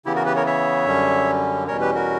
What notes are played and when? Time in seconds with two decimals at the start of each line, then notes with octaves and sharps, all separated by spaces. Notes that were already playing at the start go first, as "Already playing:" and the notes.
0.06 C#3 E3 B3 E4 G4
0.16 F#4 A#4
0.26 G4 B4
0.36 A#4 C#5
0.46 C#5 E5
0.87 F#2 D3 G3 C#4
1.68 E2 B2 G3 C#4 A#4 C#5
1.81 G4 B4
1.95 F#4 A#4